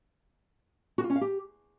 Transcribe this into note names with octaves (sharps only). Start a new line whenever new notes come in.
F#4
F4
C#4
F5
G4